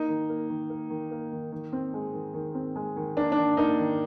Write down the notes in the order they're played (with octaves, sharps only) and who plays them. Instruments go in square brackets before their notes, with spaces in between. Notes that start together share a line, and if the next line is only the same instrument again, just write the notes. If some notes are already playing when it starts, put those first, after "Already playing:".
Already playing: [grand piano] A#3 D#4
D#3
A#3
D#3
A#3
D#3
A#3
D#3
D#3
C4
G#3
D#3
D#3
C4
G#3
D#3
A#3 D4
D4
D#3
A#3 D#4
D#3